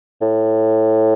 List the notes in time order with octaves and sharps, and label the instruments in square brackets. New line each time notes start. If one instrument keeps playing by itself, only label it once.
[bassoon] A2